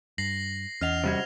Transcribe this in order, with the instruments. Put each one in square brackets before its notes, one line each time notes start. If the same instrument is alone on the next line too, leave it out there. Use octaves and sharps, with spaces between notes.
[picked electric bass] G2 [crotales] A#6 C7 F#7
[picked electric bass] E2 [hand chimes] C#4 D#5 F#5 [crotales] F6 F7
[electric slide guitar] C3 G3 F#4 [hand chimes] C5 G#6